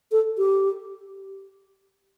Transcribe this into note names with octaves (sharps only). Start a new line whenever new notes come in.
A4
G4